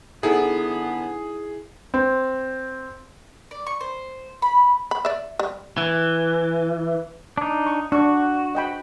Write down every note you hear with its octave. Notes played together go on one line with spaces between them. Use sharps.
D3 B3 D#4 E4 G#4 A4 E5
C4
D5
C#6
C5
B5
B5
D5 E5
G3
E3
D4 D#4
C#6
D4 F#4 C#6
D#5 G5 B5